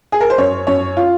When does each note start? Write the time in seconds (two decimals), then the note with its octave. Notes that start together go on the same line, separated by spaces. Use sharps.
0.12 G#4
0.20 A#4
0.30 C5
0.38 F#2 C#5
0.67 F#2 C#5
0.97 F4